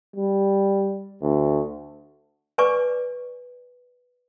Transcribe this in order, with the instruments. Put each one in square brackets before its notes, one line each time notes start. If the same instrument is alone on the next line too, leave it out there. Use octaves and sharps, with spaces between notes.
[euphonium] G3
D2
[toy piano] B4 D5 G#5 C#6 D6